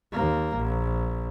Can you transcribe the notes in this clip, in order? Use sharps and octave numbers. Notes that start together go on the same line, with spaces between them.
D#2 A#3
A#1